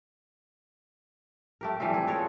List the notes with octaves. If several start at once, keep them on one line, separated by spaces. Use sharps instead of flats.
A3 G4 A#4
E3 F3 G3 C4
G#4
B3 A4 A#4 C#5